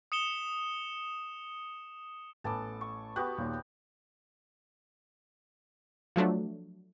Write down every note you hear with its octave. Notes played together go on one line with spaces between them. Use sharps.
D#6 C#7 E7 G7
A1 B3 A4 G#5 A5 D6
C#6
B3 F#4 G4 F#6
D#2 A#2 D#3
F3 F#3 A3 D4